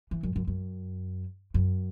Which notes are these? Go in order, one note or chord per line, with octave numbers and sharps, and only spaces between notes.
E3
F#2
F#2
F#2
F#2